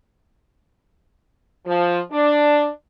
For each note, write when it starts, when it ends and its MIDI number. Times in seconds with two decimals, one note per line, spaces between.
1.66 1.99 53
2.11 2.68 62